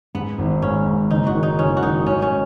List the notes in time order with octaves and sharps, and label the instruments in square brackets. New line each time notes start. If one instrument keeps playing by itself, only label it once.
[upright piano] G#2 [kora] B3
[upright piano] G#1
[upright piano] G#2 [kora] C#4
[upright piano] G#2
[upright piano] F#1 [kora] D#4
[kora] F#4
[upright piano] D#3
[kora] D#4
[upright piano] F#1 [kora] C#4
[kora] F#4
[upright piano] D#3 [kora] D#4
[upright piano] G#2 [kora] C#4
[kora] C#4